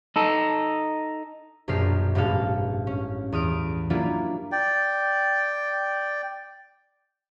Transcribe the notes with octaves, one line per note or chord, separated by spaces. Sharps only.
D#4 A4
A#1 F#2 B2 G4 F6 C7
A1 G2 B2 G#3 A4 F5
C#4
E2 D#6 F6 D7
F#3 G3 A#3 D4 E4 F4
D5 G5